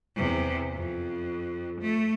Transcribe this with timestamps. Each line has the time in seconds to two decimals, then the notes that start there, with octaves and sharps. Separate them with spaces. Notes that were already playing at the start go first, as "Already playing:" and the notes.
0.16 E2 C3
0.74 F2
1.81 A3